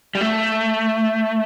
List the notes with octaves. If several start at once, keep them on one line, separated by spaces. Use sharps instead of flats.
G3
A3